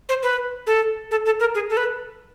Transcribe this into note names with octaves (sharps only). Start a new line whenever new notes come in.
C5
B4
A4
A4
A4
A#4
G#4
A4
B4